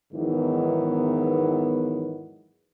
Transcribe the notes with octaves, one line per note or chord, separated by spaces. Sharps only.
E2 G#2 D#3 E3 F#3 B3